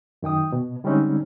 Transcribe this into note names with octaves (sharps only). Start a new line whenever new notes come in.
F#2 D#3 G5 D#6
B2
D3 G3 G#3 C4 C#4 D#4